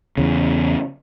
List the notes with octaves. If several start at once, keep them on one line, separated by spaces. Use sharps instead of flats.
E2 C#3